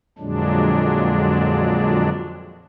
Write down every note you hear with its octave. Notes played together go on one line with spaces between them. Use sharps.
F2 A#2 D3 F#3 G#3 D4